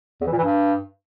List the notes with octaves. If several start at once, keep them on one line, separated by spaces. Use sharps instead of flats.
E2
E3
A#2
E3
G2